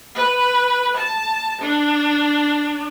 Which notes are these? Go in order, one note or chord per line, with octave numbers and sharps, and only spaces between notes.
B4
A5
D4